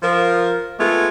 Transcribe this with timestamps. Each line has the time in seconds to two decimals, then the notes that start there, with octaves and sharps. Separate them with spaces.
0.02 F3 A#4
0.79 G#3 A3 B3 F4